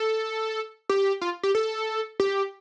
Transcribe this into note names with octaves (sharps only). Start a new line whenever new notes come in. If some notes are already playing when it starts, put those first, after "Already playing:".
Already playing: A4
G4
F4
G4
A4
G4